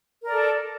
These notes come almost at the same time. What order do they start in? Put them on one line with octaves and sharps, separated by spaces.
A#4 D5 A4